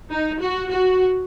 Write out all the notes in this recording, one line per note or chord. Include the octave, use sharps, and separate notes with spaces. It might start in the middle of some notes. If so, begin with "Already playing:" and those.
D#4
F#4
F#4